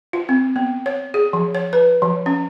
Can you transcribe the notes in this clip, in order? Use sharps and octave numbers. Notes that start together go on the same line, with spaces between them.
F4
C4
B3
C#5
G#4
F3
C#5
B4
F3
C#4